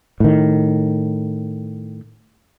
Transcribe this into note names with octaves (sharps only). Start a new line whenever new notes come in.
A2 D#3